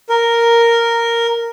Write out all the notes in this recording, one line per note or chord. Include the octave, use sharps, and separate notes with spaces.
A#4